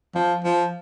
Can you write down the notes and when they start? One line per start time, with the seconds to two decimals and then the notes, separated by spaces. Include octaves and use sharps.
0.15 F3
0.44 F3